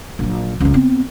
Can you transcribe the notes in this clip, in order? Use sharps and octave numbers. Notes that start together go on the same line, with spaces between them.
A#1 F#3
C#2 F3
B3 C4